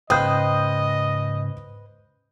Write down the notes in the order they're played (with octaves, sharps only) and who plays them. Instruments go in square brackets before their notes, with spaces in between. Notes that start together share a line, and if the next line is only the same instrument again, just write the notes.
[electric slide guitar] G#2 C#3 [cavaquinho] B4 C5 G5 [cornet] D#5 [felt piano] D#6 G6